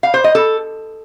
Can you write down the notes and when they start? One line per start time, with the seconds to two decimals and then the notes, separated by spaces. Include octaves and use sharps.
0.03 F5
0.14 C5
0.24 D#5
0.35 A4